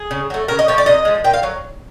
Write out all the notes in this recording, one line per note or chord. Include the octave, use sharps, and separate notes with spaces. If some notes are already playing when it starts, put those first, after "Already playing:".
Already playing: G#4
C#3
F#3 A3
C#3 A#4
D#5
F3 A3 C#5
D5
C3 D#5
F3 G#3
A#2 G5
F5
F#3